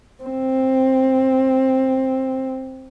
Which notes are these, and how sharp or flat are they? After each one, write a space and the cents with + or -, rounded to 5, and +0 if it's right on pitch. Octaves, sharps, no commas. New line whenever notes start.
C4 +10